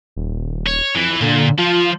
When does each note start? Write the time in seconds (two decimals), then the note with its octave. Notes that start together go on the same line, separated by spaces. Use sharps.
0.16 D#1
0.67 C#5
0.95 F2 E3
1.21 A#2 D3
1.58 F3 F4